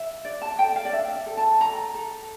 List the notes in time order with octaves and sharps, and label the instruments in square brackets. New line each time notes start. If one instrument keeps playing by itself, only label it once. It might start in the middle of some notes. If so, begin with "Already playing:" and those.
Already playing: [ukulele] E5
D4 D5
A5
A4 G5
F5
D5
D4 E5
A4
A5
A4 A#5
A4